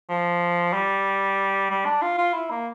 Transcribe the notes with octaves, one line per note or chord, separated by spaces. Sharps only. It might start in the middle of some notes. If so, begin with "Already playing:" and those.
F3
G3
G3
D4
F4
F4
E4
A#3